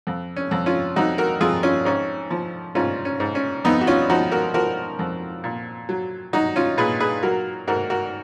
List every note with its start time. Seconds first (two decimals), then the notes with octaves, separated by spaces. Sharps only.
0.07 F2
0.36 C#4
0.51 F2
0.66 C#4 F4
0.96 F2 D#4 F#4
1.18 F#4 A#4
1.41 F2 F4 G#4
1.63 C#4 F4
1.85 G#2 C#4
2.31 F3
2.75 G#2 C#4 F4
3.05 C#4
3.20 G#2
3.35 C#4
3.65 F2 B3 D#4
3.81 F#4
3.87 C#4 F4
4.09 F3 D#4 F#4
4.31 F#4 A#4
4.54 F3 F#4 A#4
4.99 F2
5.44 A#2
5.89 F#3
6.33 F#3 D#4 F#4
6.56 C#4 F4
6.78 A#2 G#4 B4
7.00 G#4 B4
7.23 F#3 F#4 A#4
7.67 G#2 F#4 A#4
7.90 F#4 A#4